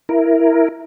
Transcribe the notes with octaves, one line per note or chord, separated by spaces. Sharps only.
E4 A#4